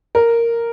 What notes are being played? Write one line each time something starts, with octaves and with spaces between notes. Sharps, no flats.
A#4